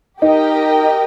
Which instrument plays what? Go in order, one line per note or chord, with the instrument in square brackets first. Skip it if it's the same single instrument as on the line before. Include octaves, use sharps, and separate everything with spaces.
[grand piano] D#4 [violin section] G4 A#4 D#5 G5